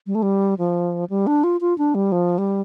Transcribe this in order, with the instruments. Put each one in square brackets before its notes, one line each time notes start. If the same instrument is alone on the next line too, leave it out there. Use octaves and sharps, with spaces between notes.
[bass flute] G3
A3
G3
F3
G3
D4
F4
F4
D4
G3
F3
G3